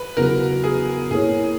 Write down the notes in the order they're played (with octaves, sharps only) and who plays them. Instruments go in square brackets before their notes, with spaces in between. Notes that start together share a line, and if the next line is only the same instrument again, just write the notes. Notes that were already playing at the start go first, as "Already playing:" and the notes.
Already playing: [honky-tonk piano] B4
[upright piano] E2 C#3 F#3 B3 F#4 [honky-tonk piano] A#4
[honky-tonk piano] G#4
[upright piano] A#2 A#3 E4 A#4 C#5 [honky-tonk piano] G#4